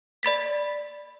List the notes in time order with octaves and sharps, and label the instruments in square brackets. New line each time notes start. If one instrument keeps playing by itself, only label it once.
[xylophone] D5 B5 A6 B6